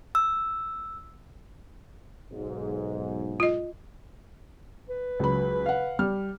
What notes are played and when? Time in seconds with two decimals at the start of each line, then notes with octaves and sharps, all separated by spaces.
0.15 E6
2.31 B1 G#2
3.40 F4 D#5
4.89 B4
5.19 C#2 F#3 B5
5.66 F5 F#5
5.99 G3 F6